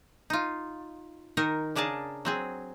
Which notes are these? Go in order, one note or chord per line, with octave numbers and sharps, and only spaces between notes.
D#4 F4
D#3 D#4 A#4
C#3 D4 G#4 A#4 A5
F#3 C4 G#4